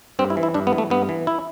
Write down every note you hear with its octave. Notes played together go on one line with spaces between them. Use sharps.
G2 C4
E4
E3
E4
G2 D4
B3
E3
A3
G2 B3
E3
E4